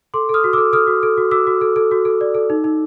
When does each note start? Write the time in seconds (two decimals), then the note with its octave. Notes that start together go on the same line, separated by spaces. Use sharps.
0.14 A4 C6 D6
0.29 A4 D#6 F6
0.44 F#4
0.53 A4 D6 E6
0.73 A4 D#6 F6
0.87 F#4
1.03 A4
1.17 F#4
1.31 F#4 D6 E6
1.47 F#4
1.61 A4
1.76 A4
1.91 F#4
2.05 A4
2.21 D5
2.35 A4
2.50 D#4
2.64 D#4